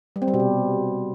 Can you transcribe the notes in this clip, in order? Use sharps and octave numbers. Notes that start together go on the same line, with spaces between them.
G3
C4
G3
B2
C3